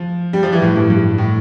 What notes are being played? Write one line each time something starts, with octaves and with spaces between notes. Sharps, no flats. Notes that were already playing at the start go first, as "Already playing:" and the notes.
Already playing: F3
G3
F3
E3
A2
G2
G2
A2